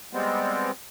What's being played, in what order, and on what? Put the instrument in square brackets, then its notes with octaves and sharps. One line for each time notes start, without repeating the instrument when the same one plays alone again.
[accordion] G3 G#3 B3 C4